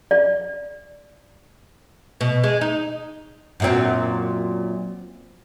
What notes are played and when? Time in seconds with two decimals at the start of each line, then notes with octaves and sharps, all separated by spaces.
0.11 D5
2.21 B2
2.44 G#3
2.61 D#4
3.60 F#2 A#2 C4